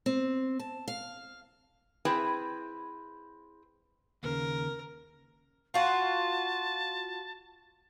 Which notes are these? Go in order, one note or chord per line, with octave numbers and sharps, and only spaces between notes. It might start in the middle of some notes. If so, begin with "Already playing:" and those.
C4
A5
F5
C4 E4 G#4 B4 G5
D#2 A#2 C#3 A#4
F4 F#4 A5